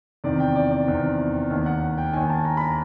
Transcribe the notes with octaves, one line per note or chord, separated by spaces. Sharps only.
E2 C3 D#3 D5
G5
D5
D5
E2 C3 D#3
D#2 D#3
F#5
G5
D#2 D#3 G#5
A5
A#5
B5
A#5